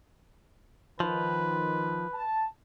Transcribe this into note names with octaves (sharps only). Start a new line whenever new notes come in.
D#3 F3 B4
A5